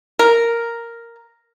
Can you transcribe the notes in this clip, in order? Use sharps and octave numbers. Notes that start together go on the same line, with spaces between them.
A#4